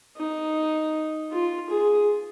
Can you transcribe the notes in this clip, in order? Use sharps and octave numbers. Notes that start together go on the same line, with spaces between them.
D#4
F4
G#4